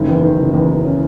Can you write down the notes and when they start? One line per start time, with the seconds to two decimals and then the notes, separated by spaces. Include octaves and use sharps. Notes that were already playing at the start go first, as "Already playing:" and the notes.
Already playing: F#1 D#3
0.08 E2
0.23 D#3
0.38 F#1
0.54 E2 D#4
0.69 D#3
0.85 C#4